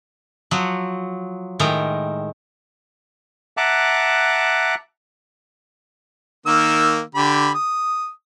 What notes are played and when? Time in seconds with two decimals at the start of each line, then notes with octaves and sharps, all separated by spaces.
0.51 F3 F#3 F#4
1.59 A2 D#3 G#3 A#4 G5
3.57 E5 F#5 A5 A#5 D6 F#6
6.46 D#3 A#3 E6
7.15 D3 G4 B5
7.54 D#6